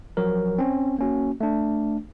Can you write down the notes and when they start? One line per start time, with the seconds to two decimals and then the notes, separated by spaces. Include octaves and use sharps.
0.17 F3 F#3 A#4
0.59 C4 C#4
0.99 A#3 C#4 F#4
1.41 A3 D4